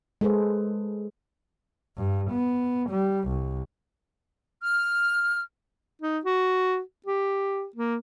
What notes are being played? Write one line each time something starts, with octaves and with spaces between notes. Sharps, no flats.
G#3 G#4 A4 B4 C5
G2
B3
G3
C2
F6
D#4
F#4
G4
A#3